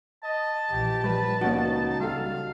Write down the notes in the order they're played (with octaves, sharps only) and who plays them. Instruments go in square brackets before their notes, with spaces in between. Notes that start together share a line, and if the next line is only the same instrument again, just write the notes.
[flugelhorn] D#5 [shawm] A5
[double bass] A#1 E3 [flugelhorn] G4
[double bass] F3 [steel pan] G3 [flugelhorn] B4
[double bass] C#2 [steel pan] A#3 C#4 F#4 [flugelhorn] D#4
[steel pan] G3 F#4 A4 [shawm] F5